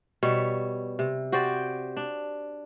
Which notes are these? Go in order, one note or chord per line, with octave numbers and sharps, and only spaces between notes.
B2 G3 C#5 E5
C3
F#4 G4 C5 D5
D4